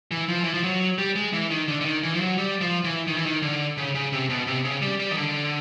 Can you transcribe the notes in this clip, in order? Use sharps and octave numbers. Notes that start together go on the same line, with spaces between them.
E3
F3
E3
F3
F#3
G3
G#3
E3
D#3
D3
D3
D#3
E3
F3
F#3
G3
F3
E3
D#3
E3
D#3
D3
C#3
C#3
C3
B2
C3
C#3
G3
G3
D#3
D3